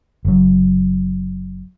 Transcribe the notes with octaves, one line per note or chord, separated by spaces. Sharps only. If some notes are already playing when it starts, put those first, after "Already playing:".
F#1 F#3